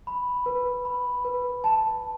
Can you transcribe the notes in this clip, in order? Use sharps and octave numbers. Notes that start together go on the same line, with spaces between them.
B5
B4
B5
B4
A5